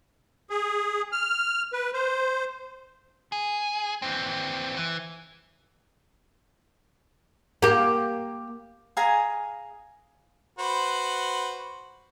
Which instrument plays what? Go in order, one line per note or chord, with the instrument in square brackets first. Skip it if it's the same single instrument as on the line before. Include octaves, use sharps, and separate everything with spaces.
[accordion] G#4
F6
B4
C5
[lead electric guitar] G#4
E3 C4
E3
[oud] A#3 G4
[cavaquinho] G#4 F5 G#5 A#5
[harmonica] F#4 B4 C5